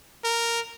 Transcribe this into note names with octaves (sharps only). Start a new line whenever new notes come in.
A#4